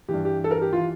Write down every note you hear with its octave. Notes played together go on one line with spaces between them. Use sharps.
G2 E3 G4
G4
A4
A#4
G4
E3 F4